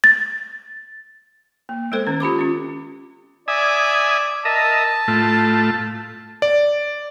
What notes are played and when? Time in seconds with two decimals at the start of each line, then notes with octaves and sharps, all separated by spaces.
0.04 A6
1.69 A#3
1.92 G#3 B3 A4 C5
2.07 D#3 C#4
2.20 F4 G4 B5 D6
2.39 C#4 F4
3.48 D5 E5 G#5 D#6
4.45 A#4 D#5 E5 A5
5.08 A2 A3 F4
6.42 D5